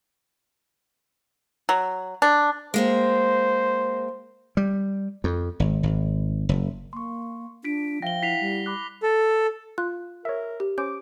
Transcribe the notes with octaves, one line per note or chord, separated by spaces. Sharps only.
F#3
D4
G#3 A#3 C4 C5
G3
F2
G#1
G#1
F#1
A#3 C6 C#6
D4 F4 B6 D7
F3 E5 F5 G5 A#6 G7
E4 F#5 B6 C7 F7
G3
B5 D6 F#6
A4
F4 F#6
A#4 C#5 E5
G4
C#4 C5 D6 G6